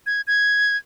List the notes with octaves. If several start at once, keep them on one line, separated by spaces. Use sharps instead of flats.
G#6
G#6